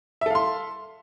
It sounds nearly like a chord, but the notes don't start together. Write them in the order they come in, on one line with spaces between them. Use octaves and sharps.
E5 A4 F5 C6